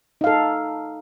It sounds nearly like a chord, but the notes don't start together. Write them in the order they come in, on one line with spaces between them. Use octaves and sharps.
D#4 F5 A4